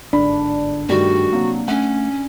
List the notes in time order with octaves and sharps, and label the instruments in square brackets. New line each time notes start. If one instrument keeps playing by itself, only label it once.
[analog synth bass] G1 [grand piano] G#2 B5 [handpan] D4
[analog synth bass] G2 [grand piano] D#3 G3 A3 [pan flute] F#4
[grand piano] C3 F#3 [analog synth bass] A#3
[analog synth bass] A3 [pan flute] C#4 [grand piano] F#5